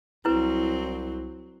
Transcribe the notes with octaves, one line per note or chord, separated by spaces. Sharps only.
C2 F#3 C4 E4 B4